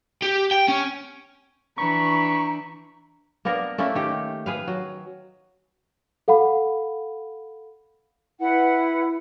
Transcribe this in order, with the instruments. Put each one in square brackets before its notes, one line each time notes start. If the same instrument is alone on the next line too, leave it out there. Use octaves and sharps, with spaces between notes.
[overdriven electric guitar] G4
G5
C#4
[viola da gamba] E3 D4 [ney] A#5 [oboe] B5 [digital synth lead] C#6
[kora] A#3 B3 D4 A#4
A3 A#3 C#4 E4
D#3 G4
G#4 B4 F5
F#3
[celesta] A4 F5 F#5 B5
[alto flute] E4 [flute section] B4 F#5